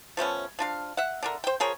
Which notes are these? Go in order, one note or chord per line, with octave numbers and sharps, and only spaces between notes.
F3 A3 B3 C#4
F3 D4 F5
E5 F#5
D3 D4 A#4
C5 G5
F3 G#4 A#4 C#5